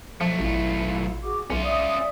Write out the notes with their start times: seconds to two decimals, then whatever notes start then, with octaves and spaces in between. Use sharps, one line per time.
0.21 B1 F3 A3
0.39 A1 E4 F4 F5
1.21 F#4 G#4 D6
1.50 B1 C#4 F4 E5
1.63 D5 E5 D#6